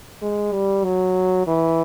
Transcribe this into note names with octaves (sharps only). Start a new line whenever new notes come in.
G#3
G3
F#3
E3